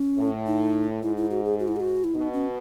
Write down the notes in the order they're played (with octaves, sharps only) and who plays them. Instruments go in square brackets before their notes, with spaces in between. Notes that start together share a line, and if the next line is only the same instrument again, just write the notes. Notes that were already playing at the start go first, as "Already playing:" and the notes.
Already playing: [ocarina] C#4
[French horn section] A2
[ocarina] D#4
[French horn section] G#2 [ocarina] E4
[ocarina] E4
F#4
G#4
F#4
E4
G#4
F#4
E4
[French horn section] B2 [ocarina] D#4
[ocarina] C#4